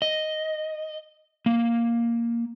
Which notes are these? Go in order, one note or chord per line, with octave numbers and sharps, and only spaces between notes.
D#5
A#3